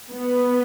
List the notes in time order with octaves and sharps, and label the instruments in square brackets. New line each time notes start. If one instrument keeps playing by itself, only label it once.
[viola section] B3